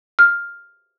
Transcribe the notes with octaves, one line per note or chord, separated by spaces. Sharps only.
F6